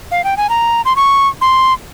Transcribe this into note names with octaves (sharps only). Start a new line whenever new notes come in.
F5
G5
G#5
A#5
C6
C#6
C6